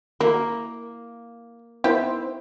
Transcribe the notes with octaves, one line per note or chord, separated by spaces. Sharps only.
A#3 E4 A#4
D#3 B3 C4 E4 G4 C5